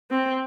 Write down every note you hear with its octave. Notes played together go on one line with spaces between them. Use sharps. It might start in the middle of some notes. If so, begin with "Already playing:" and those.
C4